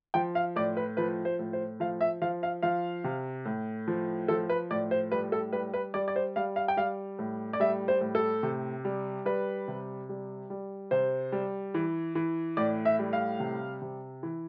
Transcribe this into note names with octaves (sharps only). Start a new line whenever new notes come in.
F3 G5
F5
A2 D5
B4
F3 B4
C5
A2
C5
F3 F5
E5
F3 F5
F5
F3 F5
C3
A2
F3
F3 A4
B4
A2 D5
C5
G3 B4
A4
G3 B4
B4
G3 D5
D5
C5
G3 F5
F5
G5
G3 F5
A2
D5
G3 E5
C5
A2
A4
C3
G3
G3 B4
C3
G3
G3
C3 C5
G3
E3
E3
A2 D5
E5
G3
F5
C3
C3
E3